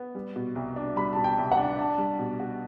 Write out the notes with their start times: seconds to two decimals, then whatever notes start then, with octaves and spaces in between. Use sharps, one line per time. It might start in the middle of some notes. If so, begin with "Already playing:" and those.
Already playing: B3
0.15 G3
0.36 B2
0.55 C2
0.76 D4
0.96 G3 B5
1.13 B2 A5
1.24 G5
1.38 C2
1.52 F#5
1.57 D4
1.78 D4 A5
1.98 G3
2.19 B2
2.40 F#4